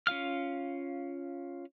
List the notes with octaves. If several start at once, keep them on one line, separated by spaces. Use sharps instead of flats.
C#4 F4 F5 F6